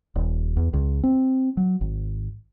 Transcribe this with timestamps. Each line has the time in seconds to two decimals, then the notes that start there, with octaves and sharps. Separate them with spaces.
0.15 D#1
0.57 E2
0.73 C#2
1.03 C4
1.57 F#3
1.81 G#1